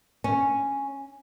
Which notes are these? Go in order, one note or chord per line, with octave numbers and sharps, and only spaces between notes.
C#4